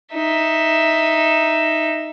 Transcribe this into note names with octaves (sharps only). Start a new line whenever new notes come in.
D#4 E5